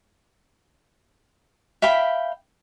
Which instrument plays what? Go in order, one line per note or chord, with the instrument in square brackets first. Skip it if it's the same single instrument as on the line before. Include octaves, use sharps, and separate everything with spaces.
[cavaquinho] E5 F5 G5 B5